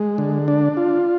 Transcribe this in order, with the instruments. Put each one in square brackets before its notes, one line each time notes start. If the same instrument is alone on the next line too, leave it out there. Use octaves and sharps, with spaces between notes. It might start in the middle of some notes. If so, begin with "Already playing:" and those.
Already playing: [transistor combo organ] G#3
D3
D4
F4